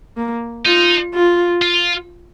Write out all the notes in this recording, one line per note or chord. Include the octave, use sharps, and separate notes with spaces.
A#3
D#4 F4
F4
F4